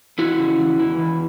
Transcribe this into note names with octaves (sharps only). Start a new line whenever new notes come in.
E2 E4 F#4
C#3
E2
E3
E2